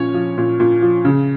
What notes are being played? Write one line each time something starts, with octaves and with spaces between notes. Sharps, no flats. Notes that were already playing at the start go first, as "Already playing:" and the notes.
Already playing: A#2 F3 C#4 C#5
F3
A#2
A#2
F3
C#3